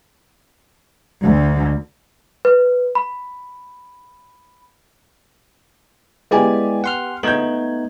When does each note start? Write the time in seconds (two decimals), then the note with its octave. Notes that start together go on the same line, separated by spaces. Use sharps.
1.22 D2
2.45 B4
2.95 B5
6.31 G#3 B3 E4 G4 D5 G#5
6.84 F#5 C6 F6
7.23 A3 B3 D#4 G6 G#6 F#7